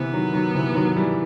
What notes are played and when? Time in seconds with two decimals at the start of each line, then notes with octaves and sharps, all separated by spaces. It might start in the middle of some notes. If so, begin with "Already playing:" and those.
Already playing: C3 E3 B3
0.13 D#3 F#3
0.33 D#3 F#3
0.54 C3 E3
0.75 D#3 F#3
0.97 E3 G3